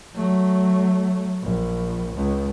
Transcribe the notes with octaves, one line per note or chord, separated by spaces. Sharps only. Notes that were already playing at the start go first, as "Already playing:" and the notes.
F#3 A3
A#1
C#2